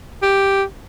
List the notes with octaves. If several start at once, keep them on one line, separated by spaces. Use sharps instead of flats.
G4